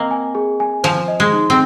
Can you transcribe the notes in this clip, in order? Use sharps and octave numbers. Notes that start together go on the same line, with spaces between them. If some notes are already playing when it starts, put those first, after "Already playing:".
Already playing: A#3 C4 D#5
G#5
G#4
G#5
F3 C5
D#5
G#3
D#4
C4